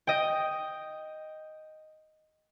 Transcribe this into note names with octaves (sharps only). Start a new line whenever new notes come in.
D#5 G5